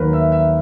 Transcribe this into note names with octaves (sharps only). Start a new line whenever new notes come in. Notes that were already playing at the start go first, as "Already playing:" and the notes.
Already playing: D#2 D#3 F#3 A#4 B4
E5
E5